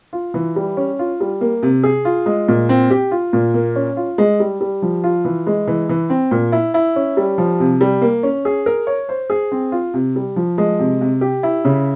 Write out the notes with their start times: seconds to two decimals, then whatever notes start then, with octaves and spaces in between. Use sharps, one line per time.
0.13 F4
0.34 E3
0.56 G3
0.77 C#4
0.99 F4
1.20 G3
1.41 A#3
1.63 C3
1.83 G#4
2.05 F4
2.26 G#3
2.48 A#2
2.69 C4
2.90 G4
3.11 F4
3.33 A#2
3.54 A#3
3.76 C#4
3.97 F4
4.18 G#3
4.40 G3
4.61 G3
4.82 F3
5.04 F4
5.25 E3
5.47 G#3
5.67 E3
5.89 E3
6.10 C4
6.31 A#2
6.52 E4
6.74 E4
6.96 C#4
7.17 G3
7.38 F3
7.60 C3
7.81 G3
8.02 A#3
8.23 C#4
8.45 G#4
8.66 A#4
8.87 C#5
9.09 C5
9.30 G#4
9.52 C4
9.72 F4
9.94 C3
10.16 G3
10.36 F3
10.58 G#3
10.80 C3
11.01 C3
11.21 G4
11.43 E4
11.65 C#3